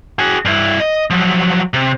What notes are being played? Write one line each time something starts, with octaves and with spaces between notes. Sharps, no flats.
F#4 G#4
G2 E4
D#5
F3 F#3
C3